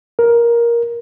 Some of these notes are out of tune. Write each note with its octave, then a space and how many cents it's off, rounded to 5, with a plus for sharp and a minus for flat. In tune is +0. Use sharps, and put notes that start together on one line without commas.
A#4 +10